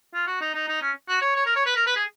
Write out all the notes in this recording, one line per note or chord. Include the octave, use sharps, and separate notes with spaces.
F4
F#4
D#4
D#4
D#4
C#4
F#4
C#5
C#5
A#4
C#5
B4
A#4
B4
G#4